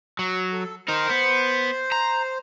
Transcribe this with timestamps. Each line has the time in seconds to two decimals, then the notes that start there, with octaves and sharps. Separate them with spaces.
0.19 F#3
0.53 A4
0.88 D#4 A#4 C5
1.10 B3
1.92 A#5